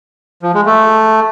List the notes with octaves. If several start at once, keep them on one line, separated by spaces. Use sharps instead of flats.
F3
G#3
A3